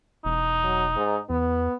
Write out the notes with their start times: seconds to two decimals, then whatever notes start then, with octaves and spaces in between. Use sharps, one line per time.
0.25 E1 D#4
0.64 F#3
0.96 G#2
1.30 E2 B3